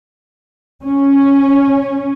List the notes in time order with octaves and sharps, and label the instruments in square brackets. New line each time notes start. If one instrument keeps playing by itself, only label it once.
[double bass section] C#4